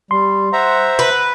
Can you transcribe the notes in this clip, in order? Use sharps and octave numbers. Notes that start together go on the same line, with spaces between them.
G3 C6
C5 E5 F#5 A#5
B4